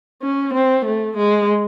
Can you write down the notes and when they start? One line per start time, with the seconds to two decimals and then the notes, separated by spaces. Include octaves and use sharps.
0.22 C#4
0.54 C4
0.85 A3
1.17 G#3